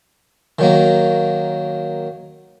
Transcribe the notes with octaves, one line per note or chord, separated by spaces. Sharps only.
D#3 F#3 A#3